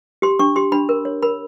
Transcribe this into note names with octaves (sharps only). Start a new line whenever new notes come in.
G4 C6
D4 C#6
G4 C6
D4 B5
A#4
C#5
A#4 B5